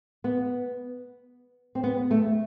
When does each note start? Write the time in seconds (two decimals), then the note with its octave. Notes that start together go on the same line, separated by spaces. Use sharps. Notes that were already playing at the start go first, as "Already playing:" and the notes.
0.24 B3
1.75 C4
1.84 B3
2.11 A3